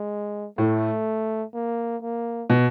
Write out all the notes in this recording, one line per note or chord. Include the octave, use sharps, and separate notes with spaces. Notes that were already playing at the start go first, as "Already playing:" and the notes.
Already playing: G#3
A2 A3
A#3
A#3
B2